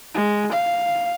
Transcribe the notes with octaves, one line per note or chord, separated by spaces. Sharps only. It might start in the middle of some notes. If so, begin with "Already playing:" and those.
G#3
F5